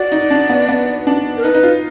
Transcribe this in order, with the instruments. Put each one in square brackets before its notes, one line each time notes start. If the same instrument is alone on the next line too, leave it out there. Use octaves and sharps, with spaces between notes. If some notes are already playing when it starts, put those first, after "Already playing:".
Already playing: [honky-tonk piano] F#4 [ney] D5
[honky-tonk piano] D#4
D4
B3
B3
D4
[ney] A#4
[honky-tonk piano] D#4 [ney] B4
[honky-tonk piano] D#4
F4